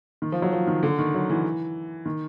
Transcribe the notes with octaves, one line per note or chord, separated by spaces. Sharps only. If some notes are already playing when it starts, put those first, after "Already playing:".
D#3
F3
F#3
F3
D#3
D3
D#3
F#3
E3
D#3